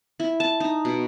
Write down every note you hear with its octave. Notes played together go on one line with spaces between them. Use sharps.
E4
A5
D#4
B2